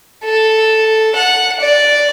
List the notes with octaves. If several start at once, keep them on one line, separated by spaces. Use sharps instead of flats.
A4
F#5
D5